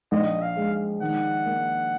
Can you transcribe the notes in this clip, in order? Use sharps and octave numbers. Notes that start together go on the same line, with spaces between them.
A#1 D#5
F5
G#3
D#3 F#5
A#3